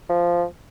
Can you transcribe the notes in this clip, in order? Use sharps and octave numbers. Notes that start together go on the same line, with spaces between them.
F3